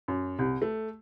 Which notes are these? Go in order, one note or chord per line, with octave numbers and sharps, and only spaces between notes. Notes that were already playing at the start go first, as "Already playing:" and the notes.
F#2
C2
A3